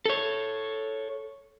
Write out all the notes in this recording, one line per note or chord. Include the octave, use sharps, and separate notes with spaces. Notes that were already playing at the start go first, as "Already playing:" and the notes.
A4 C#5